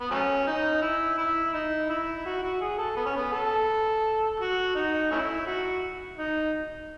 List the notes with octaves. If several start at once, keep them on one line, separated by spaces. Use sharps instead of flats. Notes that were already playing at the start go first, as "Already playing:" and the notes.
B3
F#3 A3 C#4
D#4
E4
E4
D#4
E4
F#4
F#4
G#4
A4
B3
C#4
B3
A4
F#4
D#4
A3 C#4 E4
F#4
D#4